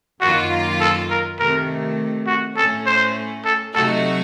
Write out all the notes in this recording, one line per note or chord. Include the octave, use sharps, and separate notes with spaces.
F#2 D#3 F#3 A#3 F4 F#4
A4
A#4
C3 D#3 A3 A#4
F#4
A2 A3 C#4 A4
C5
A4
C3 F#3 A3 D#4 F#4 A4